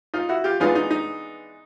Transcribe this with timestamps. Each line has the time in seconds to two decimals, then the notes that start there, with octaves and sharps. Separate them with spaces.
0.14 D#4 F4
0.29 E4 F#4
0.44 F4 G4
0.60 E3 G#3 B3 D4 D#4 F4
0.75 D#4
0.91 D#4